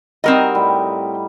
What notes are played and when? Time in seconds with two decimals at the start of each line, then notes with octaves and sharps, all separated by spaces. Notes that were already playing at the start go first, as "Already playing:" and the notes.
0.24 G3 C4 D#4 F#4 A#4 D#5
0.55 A2 G3